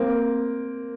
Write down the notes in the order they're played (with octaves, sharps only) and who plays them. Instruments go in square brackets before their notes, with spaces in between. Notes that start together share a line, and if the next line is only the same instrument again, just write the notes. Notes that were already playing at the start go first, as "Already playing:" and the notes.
Already playing: [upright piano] A#3 C4